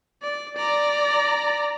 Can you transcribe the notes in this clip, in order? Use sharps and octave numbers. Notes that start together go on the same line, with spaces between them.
D5
D5 A#5